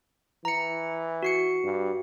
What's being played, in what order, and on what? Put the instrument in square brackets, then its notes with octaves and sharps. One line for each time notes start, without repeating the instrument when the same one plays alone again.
[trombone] E3 [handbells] A#5 C#7
[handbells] F#4 C7 C#7
[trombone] G2